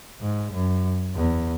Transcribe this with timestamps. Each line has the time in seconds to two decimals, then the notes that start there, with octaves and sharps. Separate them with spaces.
0.21 G#2
0.52 F#2
1.16 E2